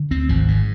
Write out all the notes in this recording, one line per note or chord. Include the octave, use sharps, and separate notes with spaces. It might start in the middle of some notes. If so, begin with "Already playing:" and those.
Already playing: D3
D2 C4
G#1 F3
G#2